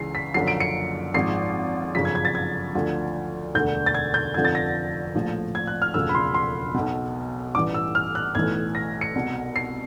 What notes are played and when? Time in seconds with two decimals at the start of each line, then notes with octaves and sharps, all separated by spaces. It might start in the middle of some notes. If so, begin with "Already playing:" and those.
Already playing: C#2 C#3 E3 C7
0.15 B6
0.34 F#1 F#2 D3 F3 C7
0.48 D7
0.60 C#7
1.14 G#1 G#2 F3 C7
1.95 G1 F#2 C#3 F3 B6
2.05 G#6
2.15 G#6
2.25 A6
2.35 G#6
2.75 D2 D3 F3
3.55 E1 D2 D3 G6
3.86 A6
3.95 G#6
4.14 G6
4.34 F1 F2 D3 F3 G#6
4.45 A6
4.55 A#6
5.15 A#1 A2 F3
5.55 G#6
5.67 F#6
5.82 F6
5.94 E1 D2 C#3 F3 E6
6.09 B5
6.15 C6
6.34 C6
6.74 B1 B2
7.55 A1 G2 E3 D6
7.74 E6
7.95 F6
8.15 F#6
8.35 B1 A2 E3 G#6
8.75 A#6
9.01 C#7
9.15 C2 B2
9.56 C7